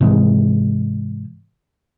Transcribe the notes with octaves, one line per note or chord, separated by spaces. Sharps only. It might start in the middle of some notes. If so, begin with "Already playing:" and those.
G#2 C3 E3 G#3